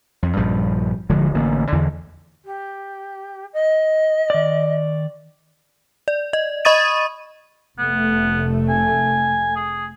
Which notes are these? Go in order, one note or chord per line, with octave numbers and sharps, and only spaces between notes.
F2
A#1 G2 F3
D1 D3 F3 G#3
A1 D3 A#3
E2 D3 E3
G4
D#5
D#3 D5
D5
D#5
D#5 B5 C#6 D#6 A6 D#7
F1 A3 B3
G#5
G#4